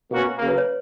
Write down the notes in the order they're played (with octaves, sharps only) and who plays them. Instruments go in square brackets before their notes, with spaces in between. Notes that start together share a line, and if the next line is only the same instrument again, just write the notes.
[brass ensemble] B2 A#3 C#4 F#4
C#3 F#3 A#3
[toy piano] B4
C#5